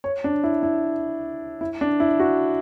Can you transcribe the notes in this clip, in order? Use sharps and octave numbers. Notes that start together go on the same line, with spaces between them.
C#5
D4
E4
E4
E4
D4
E4
F#4